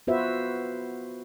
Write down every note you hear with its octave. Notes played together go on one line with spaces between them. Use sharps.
B3 F4 F#4 B4 C5 E5